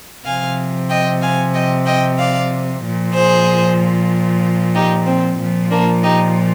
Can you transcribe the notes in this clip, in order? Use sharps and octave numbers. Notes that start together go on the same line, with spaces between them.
C3 F3 F5 G#5
D#5 G5
F5 G#5
D#5 G5
D#5 G5
D5 F5
A#2 F3
G#4 C5
D#4 G4
C4
A#2 F3
A#3 D4
D#4 G4